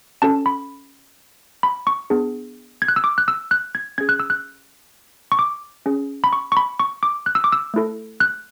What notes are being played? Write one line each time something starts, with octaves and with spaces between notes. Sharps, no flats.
C#4 F#4 A4 A5
B5
B5
C#6
B3 D4 G#4
G#6
F#6
E6
D6
F#6
E6
F#6
G#6
C#4 G#4 G#6
F#6
E6
F#6
C#6
D6
C#4 G#4
B5
C#6
C#6
B5
C#6
D6
F#6
E6
D6
E6
A3 E4 A4
F#6